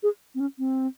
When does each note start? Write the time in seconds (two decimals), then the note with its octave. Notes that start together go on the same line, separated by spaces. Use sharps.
0.03 G#4
0.35 C4
0.40 C#4
0.59 C4